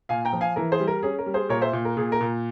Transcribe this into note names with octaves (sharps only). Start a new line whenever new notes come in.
A#2 F5 G#5
G5 A#5
F3
F5 G#5
E3 A#4
G#4 C5
G3
A#4
C#4 G#4
A#4
G3
G#4 C5
A#2 A#4 C#5
C5 E5
A#2
A#4
A#2 G#4
A#4
A#2